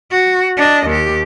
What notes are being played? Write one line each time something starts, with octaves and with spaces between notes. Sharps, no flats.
F#4
D4 D#5
D#2 G4